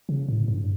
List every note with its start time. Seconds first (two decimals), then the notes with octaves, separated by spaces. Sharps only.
0.09 C#3
0.29 A2
0.48 G2